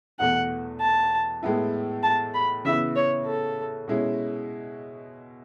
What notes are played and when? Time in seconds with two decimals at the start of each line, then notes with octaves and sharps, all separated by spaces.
0.19 E2 B2 A3 F#5
0.80 A5
1.43 A2 G#3 B3 E4
2.03 A5
2.34 B5
2.65 C#3 E3 B3 E4 E5
2.96 C#5
3.26 A4
3.88 B2 G#3 C#4 E4